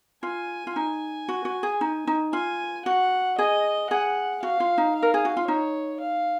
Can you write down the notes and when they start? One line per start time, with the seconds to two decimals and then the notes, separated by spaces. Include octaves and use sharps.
0.23 F4 G#5
0.67 F4
0.75 D#4 G#5
1.28 F#4
1.45 F#4
1.63 G#4
1.81 D#4
2.07 D#4
2.33 F4 G#5
2.86 F#4 F#5
3.38 G#4 D#5
3.90 G#4 F#5
4.43 F#4 F5
4.60 F4
4.78 D#4
4.95 F5
5.03 A#4
5.14 G#4
5.25 F#4
5.37 F4
5.48 D#4 C#5
6.00 F5